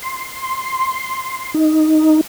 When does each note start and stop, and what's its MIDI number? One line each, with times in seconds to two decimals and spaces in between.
0.02 1.54 84
1.54 2.21 63